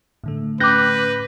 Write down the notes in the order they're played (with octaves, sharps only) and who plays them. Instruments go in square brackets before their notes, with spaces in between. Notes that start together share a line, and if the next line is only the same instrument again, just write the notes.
[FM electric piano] A2 D3 A3
[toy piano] C#4 D6 [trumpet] B4 [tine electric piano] F#6 G6 A#6